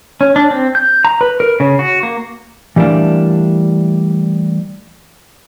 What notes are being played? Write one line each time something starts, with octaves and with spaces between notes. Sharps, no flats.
C#4
D4
C4
G6
A#5
B4
A#4
C#3
F#4
A#3
E3 G3 A3 A#3 D4